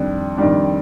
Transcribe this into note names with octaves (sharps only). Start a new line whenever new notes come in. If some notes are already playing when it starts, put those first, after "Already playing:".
Already playing: F2 D#3 G3 D4
F2 D#3 G3 D4